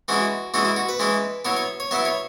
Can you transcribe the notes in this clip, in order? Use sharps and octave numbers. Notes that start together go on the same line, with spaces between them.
E3 G#3 C#4 E4 F#4
E3 G#3 C#4 E4 F#4
E4
F#4
B4
E3 G#3 C#4 E4
F#3 B3 E4 C#5
C#5
C#5
F#3 B3 E4 E5
C#5